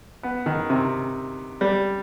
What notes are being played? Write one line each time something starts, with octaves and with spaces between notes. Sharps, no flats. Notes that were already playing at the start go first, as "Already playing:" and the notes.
B3
D#3
C3
G3